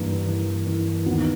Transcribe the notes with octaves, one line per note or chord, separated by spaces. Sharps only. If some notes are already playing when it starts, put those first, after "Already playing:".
Already playing: G2 E3 A#3
E3
E3
D#2 B3